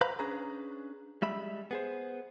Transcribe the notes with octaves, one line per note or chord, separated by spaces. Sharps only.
B4 C5 F5 A#5 B5
C#4 D4 G#4 B4 A#5
G3 G#3 E5 B5
B3 G#4 C5